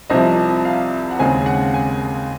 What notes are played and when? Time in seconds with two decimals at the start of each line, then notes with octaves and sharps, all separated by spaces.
0.10 C2 C3 F3 D#5
0.65 F5
1.11 F#5
1.19 D#2 C#3 G#3 C4 G#5
1.46 F#5
1.74 G#5